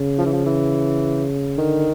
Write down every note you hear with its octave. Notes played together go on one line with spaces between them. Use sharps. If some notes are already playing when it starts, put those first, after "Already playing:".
Already playing: C#3
F3
E3
F3
E3
D3 D#3